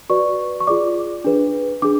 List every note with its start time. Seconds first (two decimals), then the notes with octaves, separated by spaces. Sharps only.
0.09 F#4 B4 D5 C#6
0.60 C#6
0.67 F4 G#4 D5 D6
1.24 D4 G#4 B4
1.82 D4 G#4 D6